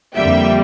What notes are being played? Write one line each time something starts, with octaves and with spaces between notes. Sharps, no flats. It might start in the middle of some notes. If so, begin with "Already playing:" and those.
F2 D3 G3 A#3 E5 G5